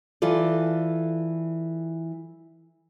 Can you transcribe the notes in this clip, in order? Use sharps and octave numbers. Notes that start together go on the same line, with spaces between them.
E3 F4 A4 D5